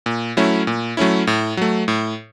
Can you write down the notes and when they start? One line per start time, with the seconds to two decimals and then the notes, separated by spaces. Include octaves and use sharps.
0.06 A#2
0.37 F#3 A3 C#4 E4
0.67 A#2
0.97 F#3 A3 C#4 E4
1.27 A2
1.57 F#3 A3
1.88 A2